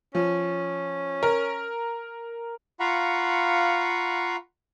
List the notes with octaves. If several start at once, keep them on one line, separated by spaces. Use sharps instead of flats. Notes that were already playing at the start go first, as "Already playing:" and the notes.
F3 C#4
A#4
F4 F5 F#5 A#5 B5 C#6